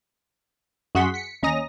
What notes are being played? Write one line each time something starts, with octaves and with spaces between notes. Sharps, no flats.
F#2 F#4 G#4 F#5 C6 B6
B6 C#7
D#2 C#4 D#5 A#5 D#6 A#6